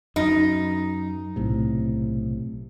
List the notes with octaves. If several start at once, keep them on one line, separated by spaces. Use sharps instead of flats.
F#2 D#4
B1 A2 C3